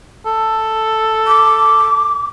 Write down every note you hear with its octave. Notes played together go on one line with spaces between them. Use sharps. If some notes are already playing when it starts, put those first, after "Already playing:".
A4
D6